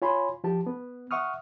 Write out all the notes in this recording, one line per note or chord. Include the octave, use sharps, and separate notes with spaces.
F4 C#5 G#5 B5 C6
F3 G4 A5
B3
E5 F#5 C#6 D#6 F6